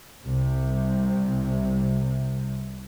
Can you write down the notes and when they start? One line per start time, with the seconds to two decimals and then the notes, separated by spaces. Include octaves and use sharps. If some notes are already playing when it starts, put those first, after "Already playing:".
0.23 C2 C3